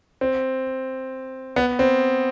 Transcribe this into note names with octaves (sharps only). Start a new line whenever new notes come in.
C4
B3
C4